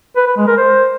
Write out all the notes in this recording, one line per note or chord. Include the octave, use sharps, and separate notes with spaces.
B4
B4
G#3
A#4
C5